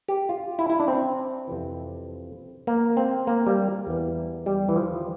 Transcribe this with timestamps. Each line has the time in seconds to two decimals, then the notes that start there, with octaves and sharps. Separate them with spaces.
0.08 G4
0.29 F4
0.59 E4
0.70 E4
0.80 D4
0.88 C4
1.48 F2 C3 E3
2.67 A#3
2.97 C4
3.27 A#3
3.47 G3
3.87 E2 E3
4.46 G3
4.69 E3
4.76 F3